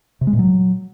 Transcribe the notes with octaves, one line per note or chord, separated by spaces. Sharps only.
C3
G#3
A#2
F#3